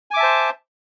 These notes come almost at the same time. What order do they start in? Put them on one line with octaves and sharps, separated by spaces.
G#5 D6 E5 A5 C5